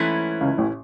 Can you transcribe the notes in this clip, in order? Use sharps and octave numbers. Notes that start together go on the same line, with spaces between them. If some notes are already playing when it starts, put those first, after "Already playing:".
Already playing: G#2 E3 A3 C#4 E4
C#2 C#3
A1 A2